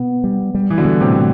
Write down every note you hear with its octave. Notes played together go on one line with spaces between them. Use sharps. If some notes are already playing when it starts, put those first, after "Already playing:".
Already playing: B2 B3
G3
G3
E3
B2 D3
G3
A2 C3